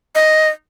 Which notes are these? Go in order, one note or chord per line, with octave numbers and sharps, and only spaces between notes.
D#5